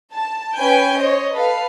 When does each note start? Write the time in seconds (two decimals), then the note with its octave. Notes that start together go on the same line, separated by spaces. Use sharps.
0.13 A5
0.54 C#4 B4 G5 G#5 G6 D7
0.99 C5 C#5 D#5
1.34 A4 B4 F5